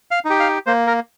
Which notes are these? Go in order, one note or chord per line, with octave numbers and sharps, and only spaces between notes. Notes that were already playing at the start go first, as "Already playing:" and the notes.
F5
D#4
G4
F5
A#3 C5
A#4